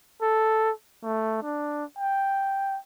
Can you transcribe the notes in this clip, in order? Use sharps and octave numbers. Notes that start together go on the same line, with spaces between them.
A4
A3
D4
G5